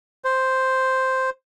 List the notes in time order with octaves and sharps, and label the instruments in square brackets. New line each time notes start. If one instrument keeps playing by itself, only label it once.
[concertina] C5